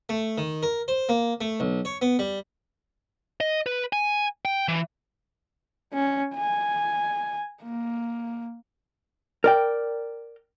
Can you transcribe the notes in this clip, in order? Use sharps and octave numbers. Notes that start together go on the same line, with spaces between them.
A3
D#3
A#4
C5
A#3
A3
B1
C#5
B3
G3
D#5
B4
G#5
G5
E3
C#4
G#5
A#3
A#4 D5 G5